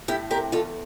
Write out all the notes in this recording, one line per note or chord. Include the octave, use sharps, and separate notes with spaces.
A2 E4 G4
C3 G4 A#4
E2 F4 A4